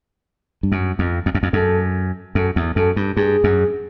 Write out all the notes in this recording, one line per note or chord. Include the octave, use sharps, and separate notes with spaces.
G2
F#2
F2
F2
F#2
F2
F#2 A4
F#2 A4
E2
F#2 A4
G2
G2 G#4
F#2